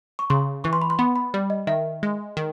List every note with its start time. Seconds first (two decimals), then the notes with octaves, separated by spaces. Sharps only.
0.19 C#6
0.30 C#3 C6
0.64 E3 C#6
0.73 C6
0.82 B5
0.90 C6
0.99 B3 B5
1.16 B5
1.34 G3
1.50 D#5
1.67 D#3 E5
2.03 G#3
2.37 D#3